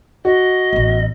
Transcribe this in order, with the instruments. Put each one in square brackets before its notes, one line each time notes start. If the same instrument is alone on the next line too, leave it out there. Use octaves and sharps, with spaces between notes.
[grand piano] F#4 [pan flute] D#5
[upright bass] A1 B3